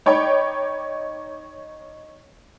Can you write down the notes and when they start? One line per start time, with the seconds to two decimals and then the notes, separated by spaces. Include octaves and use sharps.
0.06 D#4 C#5 D5 G5 B5 D6